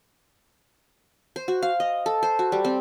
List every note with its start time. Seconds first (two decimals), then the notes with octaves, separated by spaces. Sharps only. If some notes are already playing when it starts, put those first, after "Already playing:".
1.36 C5
1.48 F#4
1.62 F5
1.80 D#5
2.06 A4
2.23 C5
2.39 F#4
2.52 G3
2.64 C4